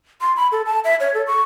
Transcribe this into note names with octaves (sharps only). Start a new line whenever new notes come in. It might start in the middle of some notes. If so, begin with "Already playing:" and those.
C6
B5
A4
A5
E5
C#5
A4
C#6